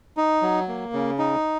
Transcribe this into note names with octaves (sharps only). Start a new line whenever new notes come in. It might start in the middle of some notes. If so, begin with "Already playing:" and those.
D#4
F#3
A#3
C#3
D#4